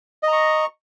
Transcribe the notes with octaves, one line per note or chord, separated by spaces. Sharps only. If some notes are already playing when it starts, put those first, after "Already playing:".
D#5 A#5 C#6